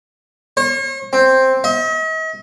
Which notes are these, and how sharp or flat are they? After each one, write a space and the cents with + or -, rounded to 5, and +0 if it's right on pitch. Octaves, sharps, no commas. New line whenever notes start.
C#5 -45
C4 +5
D#5 +45